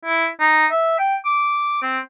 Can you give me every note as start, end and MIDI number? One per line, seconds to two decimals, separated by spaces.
0.05 0.27 64
0.40 0.66 63
0.71 0.98 76
0.99 1.16 79
1.25 1.78 86
1.82 1.99 60